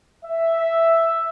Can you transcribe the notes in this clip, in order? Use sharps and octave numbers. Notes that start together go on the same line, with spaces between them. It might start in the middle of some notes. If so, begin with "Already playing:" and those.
E5